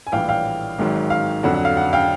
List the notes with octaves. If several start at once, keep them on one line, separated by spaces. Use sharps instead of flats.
G#5
A#1 A2 E3 G3 F5 G5
F5 G5
G#1 G#2 D#3 F#3
F5
F2 D3 F#3 F#5
F#5
F5
F#5
F5 G5